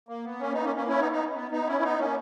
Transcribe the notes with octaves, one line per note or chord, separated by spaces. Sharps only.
A#3
B3
A#3 C#4
B3 D#4
A#3 C#4
A#3 C#4
C#4 E4
B3 D#4
B3 D#4
B3
B3 D#4
C#4 E4
B3 D#4
A#3 C#4